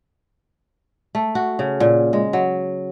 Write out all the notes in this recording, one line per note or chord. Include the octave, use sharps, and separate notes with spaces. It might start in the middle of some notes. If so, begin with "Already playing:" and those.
A3
F#4
C#3
A#2
G#3
F#3